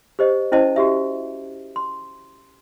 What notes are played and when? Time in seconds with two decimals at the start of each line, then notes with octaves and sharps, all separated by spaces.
0.19 G4 C5 D#5
0.52 C#4 E4 C5 D#5 A5
0.76 F#4 G4 E5
1.76 C6